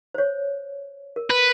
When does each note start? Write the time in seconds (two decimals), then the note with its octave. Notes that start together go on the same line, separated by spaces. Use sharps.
0.14 C5 C#5
1.16 A#4
1.30 B4